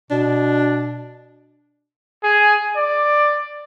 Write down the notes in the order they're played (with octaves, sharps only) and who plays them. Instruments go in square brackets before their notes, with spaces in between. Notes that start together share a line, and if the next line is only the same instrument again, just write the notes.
[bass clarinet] B2 [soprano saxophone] D4
[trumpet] G#4
D5